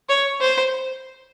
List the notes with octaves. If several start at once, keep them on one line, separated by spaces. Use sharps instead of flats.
C#5
C5